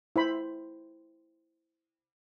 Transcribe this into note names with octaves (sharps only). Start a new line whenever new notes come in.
E4 C5 B5